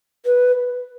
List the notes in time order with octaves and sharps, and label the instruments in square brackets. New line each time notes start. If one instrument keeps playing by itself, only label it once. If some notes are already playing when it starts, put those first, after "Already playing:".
[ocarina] B4